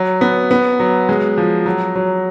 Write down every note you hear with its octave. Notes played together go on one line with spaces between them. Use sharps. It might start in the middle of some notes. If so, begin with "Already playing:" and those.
Already playing: F#3
B3
B3
F#3
G#3
F3
F#3
F#3